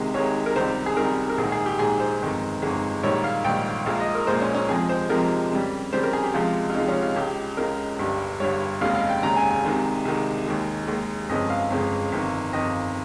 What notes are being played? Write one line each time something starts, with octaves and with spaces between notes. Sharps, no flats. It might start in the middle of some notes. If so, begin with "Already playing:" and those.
Already playing: C2 C3 D#3 G#3
C2 C3 D#3 G#3 C#5
A#4
C#2 C3 D#3 G3 C5
G#4
C#2 C3 D#3 G3 A#4
A#4
A#1 G#2 D#3 G#4
G#4
G4
A#1 G#2 D#3 G#4
C5
G1 F2 D#3 G#3
G1 F2 D#3 G#3
A#1 G#2 D#3 G3 C#5
F5
A#1 G#2 D#3 G3 G5
A#1 A#2 G#3 F5
D#5
A#4
A#1 A#2 G#3 C5
C#4
C#4
F2 C3 F3 G#3 G#4
C5
F2 C3 F3 G#3 A#4
F2 C#3 G3
F2 C#3 G3 C5
A#4
G#4
G4
C#2 C3 F3 G#3 F4
F4
C#2 C3 F3 G#3 D#4
C#4
F4
C#2 C#3 G#3 G4
C#2 C#3 G#3 A#4
G1 G2 G3
G1 G2 G3 C#5
F1 D#2 C#3 G#3 F5
F5
G5
F1 D#2 C#3 G#3 A#5
G#5
G#5
C2 C3 D#3 G#3
C2 C3 D#3 G#3
D#2 D#3 G#3
D#2 D#3 G#3
G1 F2 C#3 G#3 D#5
F5
G1 F2 C#3 G#3
G1 F2 D#3
G1 F2 D#3 D#5